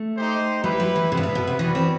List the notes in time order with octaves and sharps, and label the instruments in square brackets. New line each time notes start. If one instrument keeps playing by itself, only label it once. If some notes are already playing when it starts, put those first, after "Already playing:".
Already playing: [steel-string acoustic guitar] A3
[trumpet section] D#4 G4 C5
[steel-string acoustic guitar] G3 [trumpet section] E4 G4 B4
[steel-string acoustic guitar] F#3
E3
[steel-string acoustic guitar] C3 [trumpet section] B3 E4 B4
[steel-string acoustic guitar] G2
A2
B2
C3
[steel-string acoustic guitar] E3 [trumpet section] G3 B3 F#4 B4
[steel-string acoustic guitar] C4